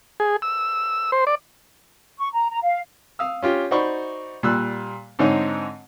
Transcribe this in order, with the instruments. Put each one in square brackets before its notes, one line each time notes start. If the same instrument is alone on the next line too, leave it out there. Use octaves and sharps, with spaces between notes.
[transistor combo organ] G#4
E6
C5
D5
[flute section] C#6
A#5
A#5
F5
[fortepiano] F5 D#6 E6
C#4 F4 G4
D#4 F#4 C5 D5 B5 C#6
A#2 G3 E6 F#6
G#2 D3 C4 D#4 C#5 D#5